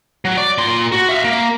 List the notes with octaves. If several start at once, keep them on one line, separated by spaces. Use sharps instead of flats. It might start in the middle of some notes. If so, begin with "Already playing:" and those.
F#3
D5
A#2 C6
F#4
E5 F5
A#3